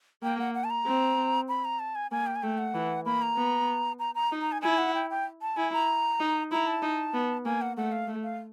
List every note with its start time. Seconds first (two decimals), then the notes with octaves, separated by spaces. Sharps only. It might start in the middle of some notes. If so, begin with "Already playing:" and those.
0.23 A#3 G5
0.39 F#5
0.54 F#5
0.64 A5
0.70 A#5
0.86 C4
1.48 B5
1.65 A#5
1.79 A5
1.95 G#5
2.11 A#3 G#5
2.27 G5
2.36 G#5
2.43 A3 G5
2.58 F#5
2.74 E3
3.06 A#3 B5
3.22 A#5
3.37 B3
3.99 A#5
4.15 A#5
4.31 D#4
4.41 A#5
4.52 G#5
4.62 E4 G#5
4.78 F#5
4.95 G5
5.10 G5
5.42 A5
5.57 E4 G#5
5.73 A#5
6.20 D#4
6.52 E4 A#5
6.67 A5
6.82 D#4
7.14 B3
7.45 A#3 G#5
7.61 F#5
7.77 A3 F#5
7.92 F5
8.08 A3
8.24 F5